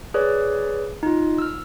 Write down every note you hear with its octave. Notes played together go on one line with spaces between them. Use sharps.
G#4 B4 C#5 D5
D#4 F4
E6 F6